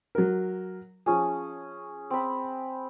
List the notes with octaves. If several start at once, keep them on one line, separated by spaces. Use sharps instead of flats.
F#3 A#4
F3 C#4 G#4
C4 B5